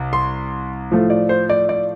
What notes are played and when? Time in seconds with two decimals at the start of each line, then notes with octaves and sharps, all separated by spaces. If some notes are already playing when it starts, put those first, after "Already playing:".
Already playing: C2
0.13 C6
0.91 A2 F3 A3
1.10 D5
1.29 C5
1.50 D5
1.69 D5